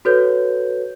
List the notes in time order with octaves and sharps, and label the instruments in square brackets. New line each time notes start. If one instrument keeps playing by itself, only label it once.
[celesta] F#4 A4 B4 C#5 G6